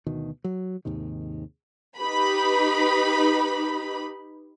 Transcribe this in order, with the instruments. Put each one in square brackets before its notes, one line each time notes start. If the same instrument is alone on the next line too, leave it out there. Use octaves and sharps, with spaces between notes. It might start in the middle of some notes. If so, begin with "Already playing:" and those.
[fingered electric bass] D2 B2 D#3
F#3
D#2 G#2 C3 D#3
[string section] D#4 G4 B4 B5